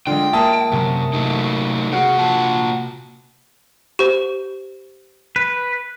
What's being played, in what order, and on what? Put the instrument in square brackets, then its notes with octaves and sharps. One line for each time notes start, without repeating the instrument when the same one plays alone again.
[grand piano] D3 [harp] G#3 F4 [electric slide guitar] G5
[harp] A#3 [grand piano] E5 A5 D#6
[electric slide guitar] F#2 [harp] C3
[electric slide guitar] F#3 A3 D#4
[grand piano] F#4 [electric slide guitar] G#4 C#5
[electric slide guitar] A#3 F4 A5
[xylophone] G4 C5
[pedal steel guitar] B4